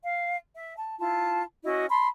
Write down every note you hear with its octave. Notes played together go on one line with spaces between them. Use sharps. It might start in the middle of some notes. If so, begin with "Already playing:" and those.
F5
E5
A5
E4 F4 A5
C#4 E4 F#4 D#5
A5 B5 C6